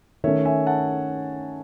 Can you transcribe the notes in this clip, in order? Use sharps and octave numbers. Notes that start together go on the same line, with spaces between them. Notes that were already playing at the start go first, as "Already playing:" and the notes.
D#3 A3 C#4 C#5 E5
E5 G#5
F#5 A5